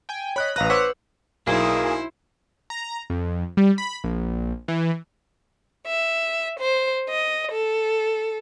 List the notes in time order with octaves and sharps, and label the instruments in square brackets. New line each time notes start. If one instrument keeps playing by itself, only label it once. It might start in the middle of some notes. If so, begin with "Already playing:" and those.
[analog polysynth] G5 G#5
[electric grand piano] C#5 F#6 [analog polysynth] D#5 B5
[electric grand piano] A1 F5 F#6 [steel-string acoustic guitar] B4 [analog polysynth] A#5 D#6 A#6
[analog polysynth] C5 C#5 F#5 [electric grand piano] D6 E6 B6
[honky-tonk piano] B1 [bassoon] A#3 [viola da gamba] E4 C5 [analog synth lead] G#4
[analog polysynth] A#5
F2
G3
B5
A#1
E3
[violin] E5
C5
D#5
A4